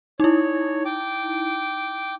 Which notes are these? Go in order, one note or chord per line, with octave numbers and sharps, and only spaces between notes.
D#4 E4 C#5
G5 D6